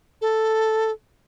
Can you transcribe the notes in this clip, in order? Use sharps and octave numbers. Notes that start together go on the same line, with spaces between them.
A4